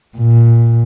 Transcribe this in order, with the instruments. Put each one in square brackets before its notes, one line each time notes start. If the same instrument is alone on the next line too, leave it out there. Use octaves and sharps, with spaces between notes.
[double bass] A#2